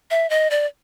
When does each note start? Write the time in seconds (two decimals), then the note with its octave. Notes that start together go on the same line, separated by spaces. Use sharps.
0.11 E5
0.30 D#5
0.51 D5